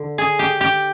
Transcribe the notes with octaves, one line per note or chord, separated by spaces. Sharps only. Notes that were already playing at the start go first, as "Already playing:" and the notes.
Already playing: D3
G#4
G4
G4